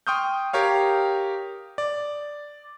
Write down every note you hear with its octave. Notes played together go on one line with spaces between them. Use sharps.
G5 C6 C#6 D#6 F6 G6
G4 A#4 C#5 F5
D5